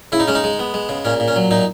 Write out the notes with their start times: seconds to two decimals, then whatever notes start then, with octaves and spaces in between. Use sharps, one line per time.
0.12 C#3 E4
0.20 D#4
0.28 G#3 C#4
0.35 D#4
0.44 G#3
0.59 B3
0.74 G#3
0.89 C#3
1.05 A#2 C#4
1.20 A#2
1.28 C#4
1.36 F#3
1.51 A#2 D#4